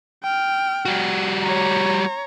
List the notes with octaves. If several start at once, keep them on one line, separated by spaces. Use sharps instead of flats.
G5 F6
G3 F#4
C#5 A#5